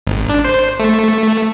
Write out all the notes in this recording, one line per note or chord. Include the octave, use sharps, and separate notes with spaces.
G#1
D4
C5
A3